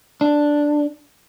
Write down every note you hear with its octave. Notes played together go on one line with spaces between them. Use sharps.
D4